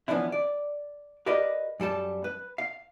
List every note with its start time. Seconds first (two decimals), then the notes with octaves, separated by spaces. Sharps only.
0.08 E3 F3 B3 C#4 D4 E4
0.32 D5
1.26 G4 A#4 B4 D5 D#5
1.80 F#2 G3 A4 A5
2.24 B4
2.58 F5